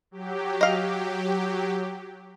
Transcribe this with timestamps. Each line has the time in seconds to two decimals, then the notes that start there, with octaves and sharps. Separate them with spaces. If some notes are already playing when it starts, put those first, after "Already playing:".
0.11 F#3 G4
0.61 D#5 F5